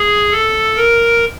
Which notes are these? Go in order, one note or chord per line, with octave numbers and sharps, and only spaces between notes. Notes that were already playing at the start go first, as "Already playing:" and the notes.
Already playing: G#4
A4
A#4